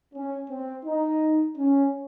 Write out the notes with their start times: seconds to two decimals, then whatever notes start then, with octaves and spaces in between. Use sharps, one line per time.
0.14 C#4
0.50 C4
0.86 D#4
1.58 C#4